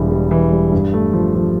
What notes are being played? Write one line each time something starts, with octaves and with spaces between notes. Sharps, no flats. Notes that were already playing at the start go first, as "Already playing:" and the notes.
Already playing: E1 E3 G3
G3
E3
G3
G2
A3
F3
F3